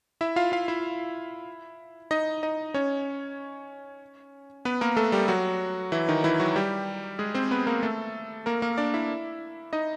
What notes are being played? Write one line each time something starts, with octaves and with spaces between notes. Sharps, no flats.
E4 E5
F4 F5
F4 F5
E4 E5
D#4 D#5
D#4 D#5
C#4 C#5
B3 B4
A#3 A#4
A3 A4
G3 G4
F#3 F#4
E3 E4
D#3 D#4
E3 E4
F#3 F#4
G3 G4
G#3 G#4
C4 C5
B3 B4
A#3 A#4
A3 A4
A#3 A#4
A#3 A#4
D4 D5
E4 E5
D#4 D#5